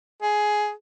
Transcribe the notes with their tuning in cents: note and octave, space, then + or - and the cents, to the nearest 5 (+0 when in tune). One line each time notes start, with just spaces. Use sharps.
G#4 +10